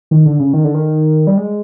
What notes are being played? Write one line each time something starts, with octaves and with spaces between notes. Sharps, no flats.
D#3
D3
C#3
D#3
D3
D#3
G3
G#3